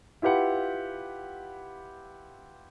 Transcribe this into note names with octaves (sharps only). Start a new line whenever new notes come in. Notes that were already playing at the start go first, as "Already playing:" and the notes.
E4 F4 G4 B4 F#5